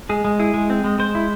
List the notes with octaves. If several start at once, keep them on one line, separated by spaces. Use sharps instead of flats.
G#3 G#4
G#3
E4 G#4
G#3
C4
G#3
G#3 C5
E4